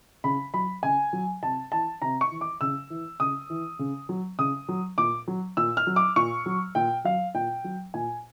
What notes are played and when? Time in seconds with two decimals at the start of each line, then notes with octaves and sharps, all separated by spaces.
0.24 C#3 B5
0.54 F#3 B5
0.83 C#3 G#5
1.13 F#3
1.42 C3 A5
1.72 E3 A5
2.02 C3 A#5
2.21 C#6
2.31 E3
2.41 D6
2.61 C#3 E6
2.90 E3
3.20 C#3 D#6
3.50 E3
3.79 C#3
4.09 F#3
4.39 C#3 D#6
4.69 F#3
4.98 A#2 D6
5.28 F#3
5.57 A#2 E6
5.77 F6
5.87 F#3
5.96 D6
6.16 A#2 C#6
6.46 F#3
6.75 A#2 G5
7.05 F#3 F5
7.35 A#2 G5
7.64 F#3
7.94 A#2 G#5